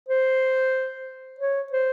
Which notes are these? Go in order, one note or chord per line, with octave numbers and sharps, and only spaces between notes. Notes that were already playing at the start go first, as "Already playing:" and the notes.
C5
C#5
C5